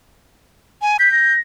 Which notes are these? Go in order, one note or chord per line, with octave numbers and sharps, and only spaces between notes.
G#5
G6 B6
A#6